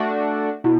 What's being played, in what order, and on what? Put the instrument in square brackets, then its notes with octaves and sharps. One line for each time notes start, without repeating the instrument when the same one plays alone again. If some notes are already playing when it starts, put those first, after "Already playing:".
Already playing: [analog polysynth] A3 D4 F#4
[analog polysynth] B2 [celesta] E4